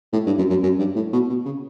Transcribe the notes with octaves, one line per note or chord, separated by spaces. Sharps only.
A2
G2
F#2
F#2
F#2
G2
A2
B2
B2
C#3